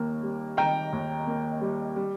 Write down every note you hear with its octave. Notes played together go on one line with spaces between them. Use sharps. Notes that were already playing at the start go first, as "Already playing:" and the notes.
Already playing: D#2 A#3
G3
D#3 G5 A#5
D#2
A#3
G3
G3